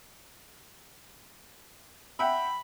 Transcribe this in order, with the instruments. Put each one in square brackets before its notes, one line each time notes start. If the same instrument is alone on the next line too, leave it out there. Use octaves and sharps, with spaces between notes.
[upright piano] E5 F#5 G5 [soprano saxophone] B5